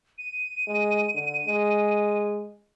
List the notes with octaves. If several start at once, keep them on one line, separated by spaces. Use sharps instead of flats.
D#7
G#3
D3
G#3